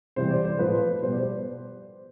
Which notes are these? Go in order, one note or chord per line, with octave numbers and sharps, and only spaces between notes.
C3 E3 G3 C5
D5
C5
A2 F3 B4
B2 G3 C5
D5
C5